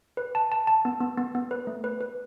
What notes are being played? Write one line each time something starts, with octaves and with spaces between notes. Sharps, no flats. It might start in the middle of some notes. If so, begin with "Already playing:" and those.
B4
A5
A5
A5
B3
B3
B3
B3
B4
A3
B4
B4